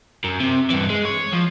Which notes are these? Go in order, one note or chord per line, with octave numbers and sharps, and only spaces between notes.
F#2
C3
G2 E3
G#3
C#5
F3